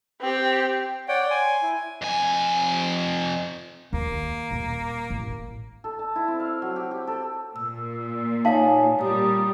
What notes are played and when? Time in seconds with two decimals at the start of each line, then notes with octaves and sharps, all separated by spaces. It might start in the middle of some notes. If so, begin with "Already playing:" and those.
0.20 C4 G4
1.08 C#5 D5 F#5 G5
1.31 G#5 C6
1.63 E4
2.02 F2 G#5
3.93 D#2 A#3
4.51 D#1
5.10 A1
5.84 A4
5.99 A5
6.16 E4
6.28 C4
6.40 F5
6.62 F#3
6.76 G4
6.91 G4
7.07 A4
7.56 A#2 E6
8.45 D#4 C#5 F5 G#5 A5
8.99 A#2 G3 A#5 D#6